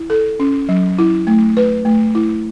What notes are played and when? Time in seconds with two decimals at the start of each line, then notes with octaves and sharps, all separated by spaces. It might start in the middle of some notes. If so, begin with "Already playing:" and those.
Already playing: E4
0.10 A4
0.40 C#4
0.69 F#3
0.99 E4
1.27 A3
1.57 B4
1.85 A3
2.15 E4